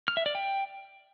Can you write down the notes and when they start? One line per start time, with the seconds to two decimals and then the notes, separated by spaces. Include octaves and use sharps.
0.08 F6
0.17 E5
0.26 D5
0.35 G5